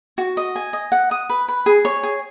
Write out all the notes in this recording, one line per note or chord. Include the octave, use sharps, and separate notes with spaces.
F#4
D#5
G#5
D#5
F#5
D#6
B4
B4
G#4
C#5
G#4